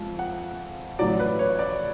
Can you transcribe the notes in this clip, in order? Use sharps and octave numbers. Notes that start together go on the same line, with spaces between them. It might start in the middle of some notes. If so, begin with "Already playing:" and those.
Already playing: F2 F3 G#3
F#5
A1 A2 F#3 D5
B4
C#5
D5